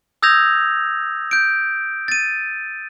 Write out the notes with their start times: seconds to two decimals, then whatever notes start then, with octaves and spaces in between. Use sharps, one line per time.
0.23 D#6 E6 G6 G#6 A#6 F7
1.31 G6 D7
2.08 A6 D#7